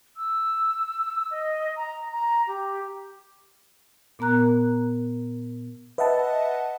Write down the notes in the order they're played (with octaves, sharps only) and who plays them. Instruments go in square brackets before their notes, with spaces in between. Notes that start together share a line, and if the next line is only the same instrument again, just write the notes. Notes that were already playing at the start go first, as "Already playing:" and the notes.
[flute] E6
D#5
A#5
A#5
G4
[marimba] A#2 B3 A#4 A#5 F#6
[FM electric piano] B4 D#5 E5 F#5 A5